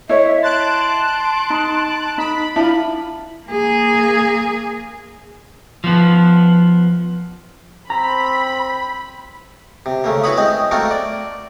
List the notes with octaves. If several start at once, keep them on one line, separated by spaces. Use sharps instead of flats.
E4 C#5 D#5 E5
A5 C6 F#6 D7
D#4
D#4 B5
D4 E4 F4 E5 A5
A#3 G#4
F3 B3
C4 A#5 B5
C3
C#3 A3 A#3
E4 F#4 B4 C#5 B5 D#6
G#3 C4 D#5
A3 A#3 C4 F#4 A4 A#4
D5